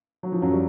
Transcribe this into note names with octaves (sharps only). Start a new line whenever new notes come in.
F#3
F3
F#2 F#3
G3